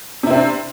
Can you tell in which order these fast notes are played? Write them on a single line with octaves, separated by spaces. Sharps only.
C3 E4 C4 D4